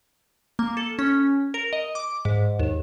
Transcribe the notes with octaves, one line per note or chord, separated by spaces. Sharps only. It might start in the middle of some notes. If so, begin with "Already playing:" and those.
A#3
A4
C#4
A#4
D#5
D6
G#2
D#2